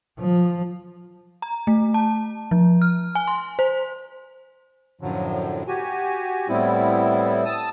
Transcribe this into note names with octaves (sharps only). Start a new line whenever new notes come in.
F3
A#5
A3
A5
F3
F6
G#5
C6
C5
F#2 A2 D3 F3 F#3
F#4 G4 G#5
A2 G3 B3 C4 E4
A5 D#6 E6